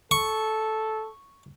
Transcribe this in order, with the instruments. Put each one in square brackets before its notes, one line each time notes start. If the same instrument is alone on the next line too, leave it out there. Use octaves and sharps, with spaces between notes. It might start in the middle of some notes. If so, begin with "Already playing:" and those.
[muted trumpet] A4 [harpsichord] C#6